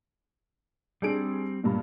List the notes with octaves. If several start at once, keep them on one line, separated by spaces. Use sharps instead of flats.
G3 C4 D4 G#4 D7
G2 A#2